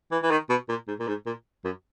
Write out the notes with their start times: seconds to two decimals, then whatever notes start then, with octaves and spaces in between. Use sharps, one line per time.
0.12 E3
0.23 E3
0.31 D#3
0.50 B2
0.69 A#2
0.88 G#2
1.00 A#2
1.08 G#2
1.26 A#2
1.65 F#2